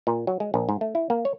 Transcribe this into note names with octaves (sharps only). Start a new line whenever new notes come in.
A#2
F#3
G#3
A#1
G#2
A3
E4
A#3
C#5